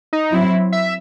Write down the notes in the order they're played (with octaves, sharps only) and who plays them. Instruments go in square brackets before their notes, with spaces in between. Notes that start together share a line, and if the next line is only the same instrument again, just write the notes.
[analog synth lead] D#4
[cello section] F#3 C4 E4
[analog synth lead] E5